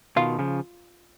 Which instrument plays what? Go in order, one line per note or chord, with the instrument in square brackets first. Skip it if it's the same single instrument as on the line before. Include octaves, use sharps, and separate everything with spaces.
[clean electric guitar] B2 D#3 [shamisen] F4
[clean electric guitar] C#3 F3